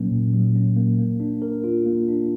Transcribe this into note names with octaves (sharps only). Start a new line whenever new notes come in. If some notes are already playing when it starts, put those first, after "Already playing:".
Already playing: A#2 F#3 A#3 C#4
A#2
F#3
C#4
A#3
A#3
D4
A#4
F4
A#3
D4